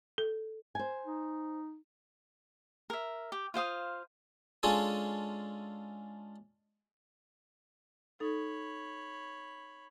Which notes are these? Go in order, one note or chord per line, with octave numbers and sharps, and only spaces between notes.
A4
C5 G#5
D#4
A#4 E5
G4
F4 C5 F5 D#6
G#3 C#4 D4 F4 G#4 A4
D#4 A4 C#5 B5